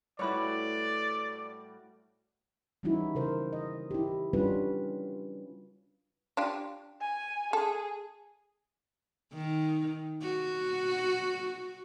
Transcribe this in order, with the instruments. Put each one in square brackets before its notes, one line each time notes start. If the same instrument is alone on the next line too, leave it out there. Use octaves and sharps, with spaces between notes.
[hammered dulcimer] A2 G3 F#4 [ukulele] E4 B4 C#5 [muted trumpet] D5
[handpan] E3 G3 C#4 D#4 E4 F#4
C#3 A#4 C5
D#5
E4 G4
G3 C#4 D4 F4 F#4 B4
[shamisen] D4 F4 G4
[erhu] G#5
[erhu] G#4 [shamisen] A4
[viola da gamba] D#3
F#4